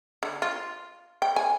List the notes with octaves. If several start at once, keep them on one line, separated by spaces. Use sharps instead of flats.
D3
F4
G5
G#5